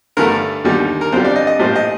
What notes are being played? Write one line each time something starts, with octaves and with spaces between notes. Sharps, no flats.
G2 D3 A3 A#4
D#2 D3 G3
A#4
F2 D3 G3 C5
D5
D#5
D#5
A#1 A2 G3 C5
D#5